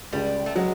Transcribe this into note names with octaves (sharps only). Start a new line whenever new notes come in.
C#2 G3
A3
F#3 G#3